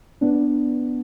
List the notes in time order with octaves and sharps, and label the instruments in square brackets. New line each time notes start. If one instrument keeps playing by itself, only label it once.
[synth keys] B3 D4